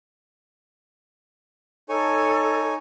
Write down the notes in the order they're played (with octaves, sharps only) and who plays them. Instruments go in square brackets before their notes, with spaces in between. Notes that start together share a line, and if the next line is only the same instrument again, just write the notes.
[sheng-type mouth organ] D#4 C#5 G#5 [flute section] A4